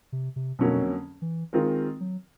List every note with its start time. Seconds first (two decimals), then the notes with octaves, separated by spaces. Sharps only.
0.12 C3
0.36 C3
0.59 F2 B2 D3 F#3 A#3 C#4
1.22 E3
1.53 D#3 G#3 C4 F4 A#4
2.00 F#3